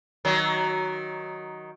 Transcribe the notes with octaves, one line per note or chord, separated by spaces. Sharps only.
D#3 F#3